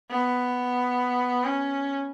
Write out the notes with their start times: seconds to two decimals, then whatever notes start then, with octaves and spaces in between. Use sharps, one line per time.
0.11 B3
1.44 C#4